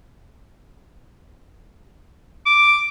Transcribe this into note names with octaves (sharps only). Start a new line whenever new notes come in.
D6